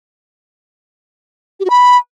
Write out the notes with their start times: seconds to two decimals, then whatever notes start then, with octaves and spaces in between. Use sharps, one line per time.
1.60 G4
1.65 F#4
1.70 B5